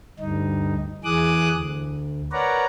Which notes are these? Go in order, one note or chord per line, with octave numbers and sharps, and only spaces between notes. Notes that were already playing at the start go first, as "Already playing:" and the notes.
D2 G2 D#4
E2 E3 G#4 D6 D#6 F#6
D2
A#4 B4 C#5 D5 F#5 A#5